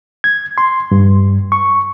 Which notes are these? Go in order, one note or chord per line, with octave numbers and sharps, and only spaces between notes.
G#6
C6
G2
C#6